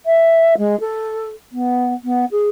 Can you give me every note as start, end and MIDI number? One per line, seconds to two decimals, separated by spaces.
0.06 0.54 76
0.57 0.78 56
0.80 1.29 69
1.52 1.93 59
2.04 2.25 59
2.31 2.49 68